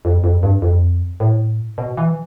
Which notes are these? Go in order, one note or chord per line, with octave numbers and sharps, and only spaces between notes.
F2
F2
G2
F2
A2
B2
E3